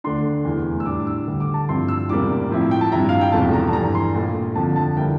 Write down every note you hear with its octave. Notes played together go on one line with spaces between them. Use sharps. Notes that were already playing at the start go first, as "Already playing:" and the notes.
D2 D3 A3 D4 C6
F1 E2 E3
E6
A2 G3 D4 D6
E6
D2 D3 G3
D6
A5
G2 F3 C4 E4 C6
E6
E1 E2 C3 G3 A#3 D6
A2 F3 C4 E4
G5
A5
G2 F3 C4 E4 A#5
F5
G5
E1 E2 C3 F3 A3 A5
A#5
A5
G2 E3 G3 A#5
C6
A#1 A#2 A3
F2 D3 F3 A5
A5
D3 G3 A#3 E4 G5